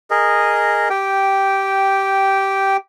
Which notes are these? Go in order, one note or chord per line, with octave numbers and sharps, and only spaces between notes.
G#4 A#4 D#5
G4 G5